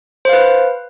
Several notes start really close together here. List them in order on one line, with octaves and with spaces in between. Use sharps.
C5 F5 B4